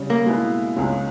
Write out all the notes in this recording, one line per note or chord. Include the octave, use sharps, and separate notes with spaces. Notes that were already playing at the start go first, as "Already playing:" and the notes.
Already playing: C#3 G3 C#4
A#3
B2 G#3 B3 E4
C#2 C#3 G#3 C#4